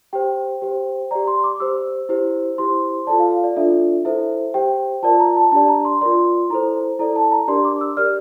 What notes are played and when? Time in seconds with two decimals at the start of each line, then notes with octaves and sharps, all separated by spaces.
0.13 G4 C5 G5
0.62 G4 C5
1.11 G4 D5 A#5
1.27 C6
1.44 D6
1.60 G4 C5 E6
2.09 E4 G4 C5
2.58 E4 G4 C5 C6
3.07 F4 A4 D5 A5
3.20 F5
3.31 F5
3.44 D5
3.56 D4 F4 A4 D5 E5
4.05 E4 A4 C5 E5
4.54 G4 C5 G5
5.03 F4 A#4 D5 A5
5.20 A#5
5.36 A5
5.52 D4 G4 D5 A5
5.68 A#5
5.85 C6
6.01 F4 A#4 D5 C6
6.50 E4 A4 C5 A#5
6.99 E4 A4 D5 A#5
7.16 A5
7.32 A#5
7.48 D4 G4 A#4 D5 C6
7.65 D6
7.81 E6
7.97 G4 A#4 D5 F6